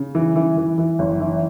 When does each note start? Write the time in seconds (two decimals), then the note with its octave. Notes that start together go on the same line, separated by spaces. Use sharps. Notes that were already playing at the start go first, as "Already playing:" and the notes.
Already playing: C#3
0.15 E3
0.36 E3
0.57 E3
0.78 E3
0.99 F#1
1.20 E3